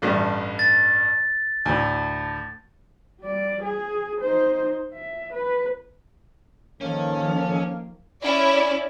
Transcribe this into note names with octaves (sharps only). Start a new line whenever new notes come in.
A1 G2 A3
A6
D2 A2
G3 D5
G#4
D#4 C5
E5
B4
D#3 F3 A#3 C#4 A4
C#4 E4 D5